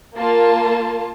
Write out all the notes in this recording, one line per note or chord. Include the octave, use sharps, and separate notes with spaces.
A#3 F4 A5